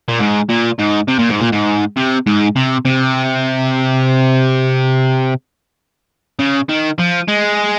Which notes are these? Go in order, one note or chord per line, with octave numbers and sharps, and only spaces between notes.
A#2
G#2
A#2
G#2
C3
A#2
G#2
A#2
G#2
C3
G#2
C3
C3
C#3
D#3
F3
G#3